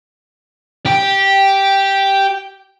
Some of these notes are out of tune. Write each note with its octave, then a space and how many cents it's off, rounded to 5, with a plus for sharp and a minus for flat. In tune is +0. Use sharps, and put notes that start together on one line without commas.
G4 -5 G5 +0